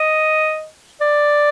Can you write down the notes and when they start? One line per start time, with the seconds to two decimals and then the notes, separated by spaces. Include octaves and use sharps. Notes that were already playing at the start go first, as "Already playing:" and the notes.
Already playing: D#5
1.01 D5